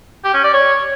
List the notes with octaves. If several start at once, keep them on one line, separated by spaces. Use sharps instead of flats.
G4
C#4
D5
C#5